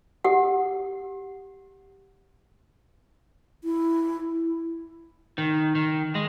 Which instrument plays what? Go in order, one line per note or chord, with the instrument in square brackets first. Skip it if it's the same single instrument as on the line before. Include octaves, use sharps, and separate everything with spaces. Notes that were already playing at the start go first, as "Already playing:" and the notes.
[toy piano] G4 F#5
[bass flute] E4
[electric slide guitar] D#3
D#3
G#3